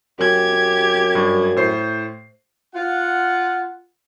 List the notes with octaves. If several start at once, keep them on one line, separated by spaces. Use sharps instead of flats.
F#2 G4 G#6
G2
A2 C5 C7
F4 F#5